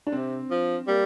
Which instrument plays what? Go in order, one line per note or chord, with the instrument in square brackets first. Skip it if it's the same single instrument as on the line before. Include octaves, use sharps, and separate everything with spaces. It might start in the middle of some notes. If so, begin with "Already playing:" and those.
[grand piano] D4
[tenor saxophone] C3 [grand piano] C4
[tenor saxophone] F3
[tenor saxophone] G3 [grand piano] A#3